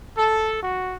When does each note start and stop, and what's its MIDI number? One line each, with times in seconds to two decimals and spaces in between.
0.17 0.59 69
0.61 0.95 66